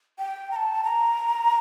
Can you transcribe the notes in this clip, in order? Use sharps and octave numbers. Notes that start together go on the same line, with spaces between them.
G5
A#5
A5
A#5